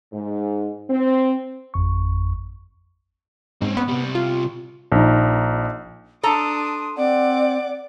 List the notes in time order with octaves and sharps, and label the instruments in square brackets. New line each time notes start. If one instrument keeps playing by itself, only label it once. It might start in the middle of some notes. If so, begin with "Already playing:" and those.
[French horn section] G#2
C4
[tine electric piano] G#1 F2 C#6
[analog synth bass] G#2 [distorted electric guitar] C4 C#4
[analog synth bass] B3
[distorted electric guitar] C3 G3
[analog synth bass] F4
[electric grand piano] A#1 D#4
[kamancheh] D4 D#6 [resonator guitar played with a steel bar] A4 A#5 [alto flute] C6
[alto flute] C4 [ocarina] D5 [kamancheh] F#5 D6